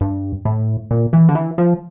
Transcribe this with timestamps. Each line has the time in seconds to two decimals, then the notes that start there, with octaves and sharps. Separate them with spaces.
0.01 G2
0.45 A2
0.91 A#2
1.13 E3
1.29 D3
1.35 E3
1.58 F3